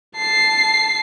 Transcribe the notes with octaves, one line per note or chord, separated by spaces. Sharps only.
A5 C7